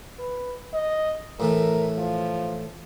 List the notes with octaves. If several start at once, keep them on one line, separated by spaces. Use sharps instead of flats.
B4
D#5
A2 E3 A3 A#4
F3